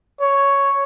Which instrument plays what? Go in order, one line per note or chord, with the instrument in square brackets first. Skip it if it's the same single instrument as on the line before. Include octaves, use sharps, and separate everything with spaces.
[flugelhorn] C#5